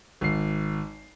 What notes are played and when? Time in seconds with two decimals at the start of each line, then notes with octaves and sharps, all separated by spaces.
0.21 G#1 C7